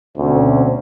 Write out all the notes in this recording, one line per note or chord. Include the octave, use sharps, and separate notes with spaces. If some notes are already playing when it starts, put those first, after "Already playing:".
D2 B2 C4 C#4